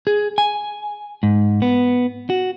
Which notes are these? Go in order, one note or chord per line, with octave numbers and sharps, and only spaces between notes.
G#4
G#5
G#2
B3
F#4